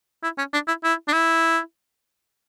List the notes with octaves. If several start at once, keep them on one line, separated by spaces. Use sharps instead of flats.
E4
C#4
D4
E4
E4
D4
E4